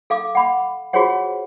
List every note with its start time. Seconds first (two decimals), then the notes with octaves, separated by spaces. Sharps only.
0.10 A4 F5 D6
0.35 F#5 B5 D6
0.93 F4 F#4 G#4 C5 C#5 F#5